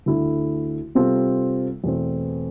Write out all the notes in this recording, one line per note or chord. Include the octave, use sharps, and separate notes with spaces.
D2 D3 A3 E4
C3 G3 C4 F4 A4
E2 B2 A3 C4